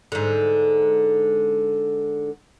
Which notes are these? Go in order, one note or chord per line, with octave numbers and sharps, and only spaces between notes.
G#2 D3